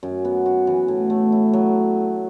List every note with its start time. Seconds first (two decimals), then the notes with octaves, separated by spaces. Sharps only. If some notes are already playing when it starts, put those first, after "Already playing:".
0.03 F#2
0.25 B3
0.46 F#4
0.67 E3
0.88 A2
1.10 A3
1.32 E4
1.53 F#3